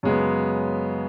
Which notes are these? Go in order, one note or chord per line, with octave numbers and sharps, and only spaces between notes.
F#2 C#3 G#3 B3